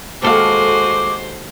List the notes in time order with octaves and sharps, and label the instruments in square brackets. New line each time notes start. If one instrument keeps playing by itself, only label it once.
[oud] D#2 A4 F5 [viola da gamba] G#3 F#4 [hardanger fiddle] C5 [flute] D6